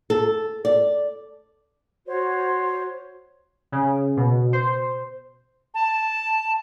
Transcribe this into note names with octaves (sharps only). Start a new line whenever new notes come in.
A4
D5
F#4 C5 C#5
C#3
B2
C5
A5